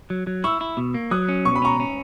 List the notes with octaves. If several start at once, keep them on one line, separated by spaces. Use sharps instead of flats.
F#3
F#3
E4 C#6 E6
E4
B2
A#3
F#3 D#6 F#6
C#4
B2 C#6
B5
C#4 A#5 C#6
C#4